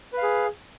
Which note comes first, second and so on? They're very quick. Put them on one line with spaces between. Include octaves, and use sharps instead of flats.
B4 F5 G#4